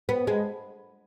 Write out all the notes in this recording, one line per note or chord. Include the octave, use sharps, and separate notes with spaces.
B3
G#3